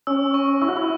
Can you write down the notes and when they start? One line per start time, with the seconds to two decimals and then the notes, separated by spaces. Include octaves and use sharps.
0.07 C#4 E6
0.34 C#6
0.62 E4 E6
0.68 F#4
0.76 E4